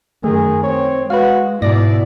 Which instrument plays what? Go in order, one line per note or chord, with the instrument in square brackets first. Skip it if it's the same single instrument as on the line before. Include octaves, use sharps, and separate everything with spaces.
[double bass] F#2 D#3 [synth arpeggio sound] A3 [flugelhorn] G#4
[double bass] C4 [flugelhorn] C#5
[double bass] G#3 [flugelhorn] F#4 [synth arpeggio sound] B4 F5
[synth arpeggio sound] G#2 A#6 [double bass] B2 E4 [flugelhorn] D5